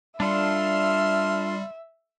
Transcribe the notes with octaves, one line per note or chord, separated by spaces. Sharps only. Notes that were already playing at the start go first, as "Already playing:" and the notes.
G3 D4 F4 A4 E5 C6 F6